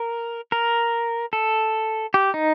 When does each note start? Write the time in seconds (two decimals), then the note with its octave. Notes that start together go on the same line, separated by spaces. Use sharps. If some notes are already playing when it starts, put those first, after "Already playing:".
Already playing: A#4
0.52 A#4
1.33 A4
2.14 G4
2.34 D#4